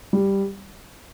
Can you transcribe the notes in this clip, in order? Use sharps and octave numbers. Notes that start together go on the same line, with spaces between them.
G3